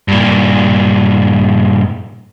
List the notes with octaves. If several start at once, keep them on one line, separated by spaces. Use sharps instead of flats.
G2 A#2